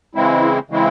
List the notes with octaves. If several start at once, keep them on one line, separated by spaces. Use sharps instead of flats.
C#3 E3 G#3 C4 E4
C#3 E3 G#3 C4 E4